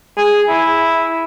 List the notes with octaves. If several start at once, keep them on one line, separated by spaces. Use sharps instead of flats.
G#4
E4